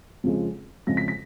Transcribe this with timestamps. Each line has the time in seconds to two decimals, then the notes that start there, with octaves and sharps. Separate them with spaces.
0.24 F2 C#3 F3 G#3
0.87 F2 C#3 G#3 A#6
0.97 B6
1.08 B6